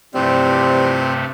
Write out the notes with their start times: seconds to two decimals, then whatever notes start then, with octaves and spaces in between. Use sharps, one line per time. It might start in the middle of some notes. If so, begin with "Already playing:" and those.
0.14 G2 C3 E3 F3 G3 A3 C4